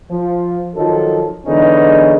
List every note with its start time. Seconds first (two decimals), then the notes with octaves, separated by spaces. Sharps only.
0.10 F3
0.76 D#3 F3 F#3 A4
1.46 D3 E3 G#3 B3 C#4 D#4